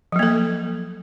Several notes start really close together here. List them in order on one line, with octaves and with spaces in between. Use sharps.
F3 F#3 A#3 A4